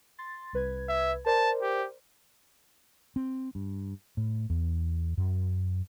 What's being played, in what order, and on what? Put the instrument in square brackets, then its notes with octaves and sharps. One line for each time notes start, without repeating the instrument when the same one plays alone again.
[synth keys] C6 A6
C2 B4 G#6
[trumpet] E5
[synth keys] A#4 C5 D5 [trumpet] A5
[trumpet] G4
[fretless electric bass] C4
G2
A2
E2
F#2